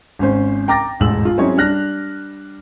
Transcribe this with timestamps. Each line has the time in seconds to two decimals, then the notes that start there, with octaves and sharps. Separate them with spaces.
0.19 G#1 C#4 C5
0.68 G5 A#5 D6 A6 A#6
1.00 E1 A1 G#2 E6 F#7
1.25 F4
1.38 F#3 C4 C#4 E4 G#4 C#5
1.57 G3 D4 F6 F#6 A#6